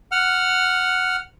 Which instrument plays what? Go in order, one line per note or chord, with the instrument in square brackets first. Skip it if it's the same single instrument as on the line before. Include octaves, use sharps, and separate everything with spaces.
[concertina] F#5 F6